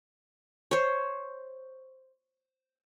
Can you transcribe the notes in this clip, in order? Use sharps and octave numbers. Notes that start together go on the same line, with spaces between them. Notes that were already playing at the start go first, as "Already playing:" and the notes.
C5 C#5